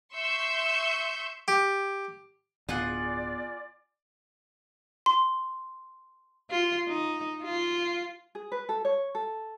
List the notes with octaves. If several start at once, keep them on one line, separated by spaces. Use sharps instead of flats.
E5 C6 C#6 E6 G6
G4
D1 B2 F4 G#4 D5 F#5
C6
F4
D#4
F4
G#4
B4
A4
C#5
A4